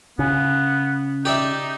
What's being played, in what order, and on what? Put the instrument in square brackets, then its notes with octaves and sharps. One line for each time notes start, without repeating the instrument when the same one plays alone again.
[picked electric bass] C#3 [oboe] B3
[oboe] D#4 [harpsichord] G4 D5 E5